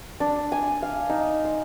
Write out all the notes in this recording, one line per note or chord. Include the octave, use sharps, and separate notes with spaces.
D4
G#5
F5
D#4
C6